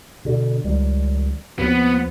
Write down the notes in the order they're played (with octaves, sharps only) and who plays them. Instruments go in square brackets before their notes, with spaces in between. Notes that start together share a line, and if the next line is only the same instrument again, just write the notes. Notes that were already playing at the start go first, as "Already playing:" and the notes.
[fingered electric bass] B2 D3
C#2 D#3 G3
[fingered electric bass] D#2 F3 C4 [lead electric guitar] B3